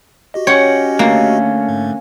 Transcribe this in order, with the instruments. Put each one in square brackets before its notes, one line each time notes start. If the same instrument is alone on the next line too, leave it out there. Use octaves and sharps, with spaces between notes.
[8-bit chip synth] F#4 G4 D#5
[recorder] C#4 [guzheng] C#5 [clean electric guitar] F#5 G5
[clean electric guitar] D3 A3 [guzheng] A#3
[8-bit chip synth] G#2